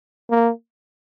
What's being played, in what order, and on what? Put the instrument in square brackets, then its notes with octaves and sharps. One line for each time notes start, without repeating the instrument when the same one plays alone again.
[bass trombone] A#3